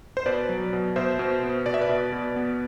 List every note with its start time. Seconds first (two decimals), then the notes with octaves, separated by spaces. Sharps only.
0.17 C5
0.26 B2 B4 D5
0.49 F#3
0.73 B2
0.96 B2 C5 E5
1.19 B2
1.43 B3
1.66 B2 D5
1.74 E5
1.81 B4 D5
1.89 B2
2.12 B2
2.36 B3